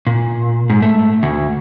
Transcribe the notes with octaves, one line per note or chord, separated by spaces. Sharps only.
A#2
G#2
A3
D2